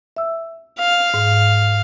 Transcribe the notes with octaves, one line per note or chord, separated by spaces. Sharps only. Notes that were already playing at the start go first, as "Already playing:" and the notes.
E5 E6
F5
G#2